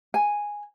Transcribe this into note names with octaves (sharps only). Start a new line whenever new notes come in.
G#5